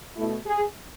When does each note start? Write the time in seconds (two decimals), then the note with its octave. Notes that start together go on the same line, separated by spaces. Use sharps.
0.16 B2 A3 E4
0.46 G#4